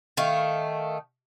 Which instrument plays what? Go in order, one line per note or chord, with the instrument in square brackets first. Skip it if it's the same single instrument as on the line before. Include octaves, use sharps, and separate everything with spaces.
[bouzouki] D#3 A3 F5